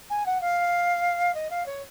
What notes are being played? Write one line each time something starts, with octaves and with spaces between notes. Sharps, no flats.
G#5
F#5
F5
D#5
F5
C#5